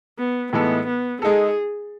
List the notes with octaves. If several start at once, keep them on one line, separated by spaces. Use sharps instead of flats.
B3
A2 E3 G#3 B3 D#4 A4
B3
G#3 D#4 G#4 A4